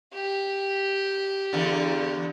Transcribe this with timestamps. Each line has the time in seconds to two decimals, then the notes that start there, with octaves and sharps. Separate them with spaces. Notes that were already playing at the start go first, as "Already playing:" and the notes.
0.14 G4
1.53 E2 D3